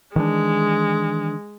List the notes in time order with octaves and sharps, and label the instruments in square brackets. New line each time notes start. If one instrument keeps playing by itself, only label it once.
[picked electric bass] D#3 E3 D4 [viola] G#3